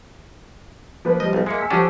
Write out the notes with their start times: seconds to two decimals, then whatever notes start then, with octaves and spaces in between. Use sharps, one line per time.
1.05 F3 A#3 B4
1.20 F3 G3 D#5
1.33 B1
1.46 G#3 A#3 E5 C#7
1.58 G#5 E6 B6
1.70 F3 C#4 D4 G4 A4 F#5